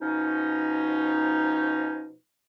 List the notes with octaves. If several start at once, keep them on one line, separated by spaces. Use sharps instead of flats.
B2 F3 C#4 D#4